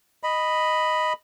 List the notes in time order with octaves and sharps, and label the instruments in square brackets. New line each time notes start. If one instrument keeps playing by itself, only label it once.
[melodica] D#5 B5